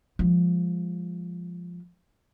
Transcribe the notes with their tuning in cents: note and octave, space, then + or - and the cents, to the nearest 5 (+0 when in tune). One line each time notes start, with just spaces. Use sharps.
F3 +0 G#3 -20